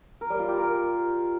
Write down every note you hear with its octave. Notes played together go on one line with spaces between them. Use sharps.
A#4
G3
F4
G4
A#4